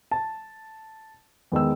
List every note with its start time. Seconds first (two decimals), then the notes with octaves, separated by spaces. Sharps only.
0.11 A5
1.52 E2 D#3 G#3 E6